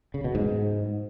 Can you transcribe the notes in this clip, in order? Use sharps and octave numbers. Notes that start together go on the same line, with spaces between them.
C#3
B2
G#2